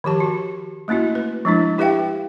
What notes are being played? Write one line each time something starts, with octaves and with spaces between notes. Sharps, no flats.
D#3 F3 G4 A5
F#4
A3 A#3 C#4 E4 F#4
B4
F3 G#3 D4 E4
E4 G4 B4 E5 F5 G5